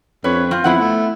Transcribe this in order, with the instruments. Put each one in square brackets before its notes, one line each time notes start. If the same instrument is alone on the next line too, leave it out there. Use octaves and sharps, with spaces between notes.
[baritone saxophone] F2 [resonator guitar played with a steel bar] B4 C#5
[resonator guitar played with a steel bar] C4 F4
[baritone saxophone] F2 [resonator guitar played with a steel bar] B3 E4 F#5
[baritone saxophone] A3